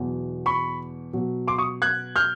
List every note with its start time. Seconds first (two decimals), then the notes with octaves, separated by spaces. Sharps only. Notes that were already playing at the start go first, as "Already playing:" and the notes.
Already playing: E2 B2 F#3
0.46 B5 C#6
1.13 B2 F#3
1.48 C6 D6
1.58 C#6 D#6
1.82 F#6 G#6
2.16 F6 G6